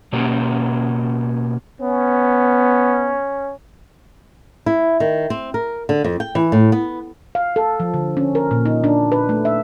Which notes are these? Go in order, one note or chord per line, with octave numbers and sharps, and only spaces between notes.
B2 A#3 C#4 G4
B3 C#4
E4
D#3
C4
A#4
D3
F2
G5
E3
A2
B3
F5
A4
F3
D3
C#4
A#4
A#2
D#4
D4
B4
A3
E5